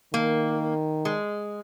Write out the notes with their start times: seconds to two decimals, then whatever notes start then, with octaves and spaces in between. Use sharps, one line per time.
0.14 D#3 A#3
1.05 G#3